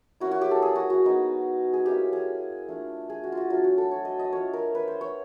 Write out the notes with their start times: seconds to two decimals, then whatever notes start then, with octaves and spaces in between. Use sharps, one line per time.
0.20 A#3 C#4 E4 F#4
0.31 F#4
0.41 G4
0.51 A4
0.62 G#4
0.76 F#4
0.90 F#4
1.04 G#3 B3 D#4
1.73 G#4
1.86 A#3 C#4 E4 G4
2.13 G#4
2.68 A3 D4 F4
3.10 G#4
3.24 F#4
3.32 F4
3.37 F#4
3.50 F#3 A3 D4 F4
3.64 F#4
3.78 A4
3.91 C#5
4.05 D#5
4.19 D#5
4.32 A3 D4 F4 C#5
4.53 A#4
4.75 B4
4.88 C5
5.01 C#5